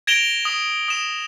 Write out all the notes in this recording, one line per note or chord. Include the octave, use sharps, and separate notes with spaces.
G#6 A#6 D7 E7 F7 G7
D#6
D#6 E7